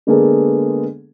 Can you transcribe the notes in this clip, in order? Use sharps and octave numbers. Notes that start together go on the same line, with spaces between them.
D3 G#3 A#3 B3 G#4 A4